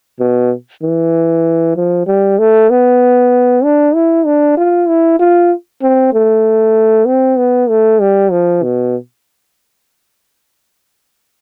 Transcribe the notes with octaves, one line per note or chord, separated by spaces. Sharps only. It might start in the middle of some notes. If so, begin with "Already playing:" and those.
B2
E3
F3
G3
A3
B3
D4
E4
D4
F4
E4
F4
C4
A3
C4
B3
A3
G3
F3
B2